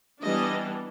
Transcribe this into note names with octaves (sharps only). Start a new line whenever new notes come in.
E3 G3 B3 D4 D#5